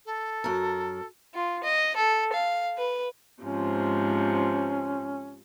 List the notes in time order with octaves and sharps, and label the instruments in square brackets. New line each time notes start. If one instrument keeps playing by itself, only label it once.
[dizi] A4
[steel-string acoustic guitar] F#2 A#4
[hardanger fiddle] F4
D#5
A4
F5
B4
[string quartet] G#2 C3 F3 [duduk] C#4